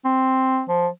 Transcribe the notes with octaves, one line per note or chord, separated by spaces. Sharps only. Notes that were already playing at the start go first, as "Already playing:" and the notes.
C4
F3